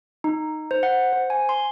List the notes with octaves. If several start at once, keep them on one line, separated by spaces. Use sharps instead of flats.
D#4
C5
F#5
C5
G#5
C6